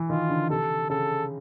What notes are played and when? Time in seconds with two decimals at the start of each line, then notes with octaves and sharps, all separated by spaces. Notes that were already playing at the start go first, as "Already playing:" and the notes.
Already playing: E3
0.10 D#3 F4
0.30 D3
0.50 C3 A4
0.90 C#3 A4